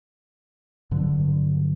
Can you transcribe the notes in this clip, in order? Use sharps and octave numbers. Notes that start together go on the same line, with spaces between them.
G2 D3 F#3